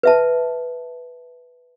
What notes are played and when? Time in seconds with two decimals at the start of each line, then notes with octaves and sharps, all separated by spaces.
0.03 B4 E5 A5